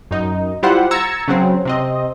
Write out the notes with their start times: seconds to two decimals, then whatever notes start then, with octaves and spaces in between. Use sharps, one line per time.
0.11 F#2 D#4
0.63 G3 E4 F4 G4 C5 F#5
0.91 A#5 E6 G#6 A6 C#7
1.28 C#3 F#3 C4
1.65 C3 C4 D#5